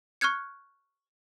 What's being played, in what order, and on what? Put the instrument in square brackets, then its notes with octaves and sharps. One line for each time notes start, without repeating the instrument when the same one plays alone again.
[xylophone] C#6 F6 F#6 G#6 C#7